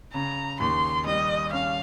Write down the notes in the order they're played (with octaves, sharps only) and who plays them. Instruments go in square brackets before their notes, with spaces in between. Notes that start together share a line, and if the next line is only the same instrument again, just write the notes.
[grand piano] C#3 [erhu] A#5
[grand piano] D#2 [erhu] C6
[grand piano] G3 [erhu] D#5
[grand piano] C#4 [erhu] F5